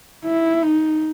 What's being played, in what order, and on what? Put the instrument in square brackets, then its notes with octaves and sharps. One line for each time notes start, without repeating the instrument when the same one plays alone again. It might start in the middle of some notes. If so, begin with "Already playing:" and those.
[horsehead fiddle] E4
D#4